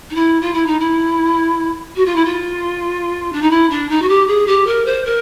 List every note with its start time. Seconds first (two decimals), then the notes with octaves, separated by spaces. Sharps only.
0.10 D#4
0.15 E4
0.41 F4
0.53 E4
0.66 D#4
0.79 E4
1.95 F#4
2.05 F4
2.15 E4
2.25 F4
3.32 D4
3.41 D#4
3.50 E4
3.70 D4
3.89 D#4
4.02 F#4
4.08 G4
4.27 G#4
4.47 G4
4.66 A#4
4.86 C5
5.05 A#4